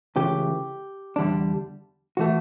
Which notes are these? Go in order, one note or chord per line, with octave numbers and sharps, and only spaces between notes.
C#2 C#3 E3 A3 G4
E2 D3 G3 D4
E3 A3 F#4